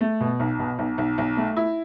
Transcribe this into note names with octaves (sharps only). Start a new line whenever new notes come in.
A3
B2
B1
B2
B1
B1
B1
A3
E4